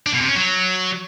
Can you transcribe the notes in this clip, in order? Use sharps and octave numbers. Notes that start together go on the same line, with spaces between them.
D4
B2
C3
C#4
F#3